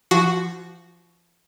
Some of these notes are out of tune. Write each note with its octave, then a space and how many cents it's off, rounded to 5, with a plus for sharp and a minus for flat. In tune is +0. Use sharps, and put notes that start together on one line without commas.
F3 -25 F#4 +0